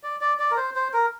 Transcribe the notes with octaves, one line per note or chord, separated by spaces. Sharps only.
D5
D5
D5
A#4
C5
C5
A#4